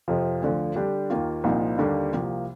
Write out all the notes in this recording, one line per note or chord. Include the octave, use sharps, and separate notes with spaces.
F2 C3 F3
D2 D3 F3
D3 G3 D4 G4
D#2 D#3 A#3 F4
C2 A#2 F3 A#3 D#4
D#2 D3 G3 A#3 D4
C2 C3 F3 A#3